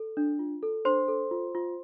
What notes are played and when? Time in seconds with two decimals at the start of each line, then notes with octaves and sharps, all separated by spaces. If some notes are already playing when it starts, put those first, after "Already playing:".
Already playing: A4
0.17 D4
0.39 F4
0.63 A4
0.85 D4 C5 C6
1.08 A4
1.31 F4
1.55 F4